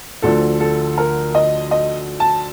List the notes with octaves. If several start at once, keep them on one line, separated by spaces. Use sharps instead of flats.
D2 D3 F3 A4
A4
A#4
D#5
D#5
A5